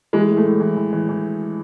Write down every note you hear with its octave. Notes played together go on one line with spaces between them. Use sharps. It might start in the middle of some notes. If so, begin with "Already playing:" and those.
E3 G#3
A2
A3
A2
E3
E3
E3
E3